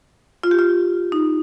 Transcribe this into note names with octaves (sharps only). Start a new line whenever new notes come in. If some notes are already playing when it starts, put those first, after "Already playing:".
F4
G4
F4
D#4